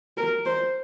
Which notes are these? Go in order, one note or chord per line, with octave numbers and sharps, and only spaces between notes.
A#4
C5